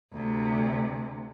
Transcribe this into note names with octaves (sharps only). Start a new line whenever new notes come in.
D2 C3